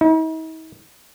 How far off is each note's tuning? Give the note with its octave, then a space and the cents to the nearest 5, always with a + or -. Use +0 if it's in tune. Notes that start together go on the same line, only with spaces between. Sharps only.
D#4 +45